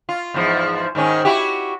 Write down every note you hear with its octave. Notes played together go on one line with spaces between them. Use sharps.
F4
E2 G#2 F3
G#2 D#3 C#4
E4 F#4 G4